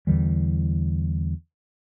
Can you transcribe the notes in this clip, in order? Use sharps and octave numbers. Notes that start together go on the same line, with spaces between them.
E2 D3 E3 G3